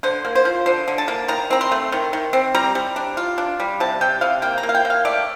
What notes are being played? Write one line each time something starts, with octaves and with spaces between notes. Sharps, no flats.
D3 C5
A#3
C5
F3
D3 C5
D3
A5
A#3
D#3 A#5
C4 A#5
C6
A3
D#3
D#3
C4
G3 A#5
G3
D4
F4
D4
G3
C3 A5
C3 G5
C3 F5
A#3 G5
A#5
A#3
F5
G5
A#3
F5
A3 D5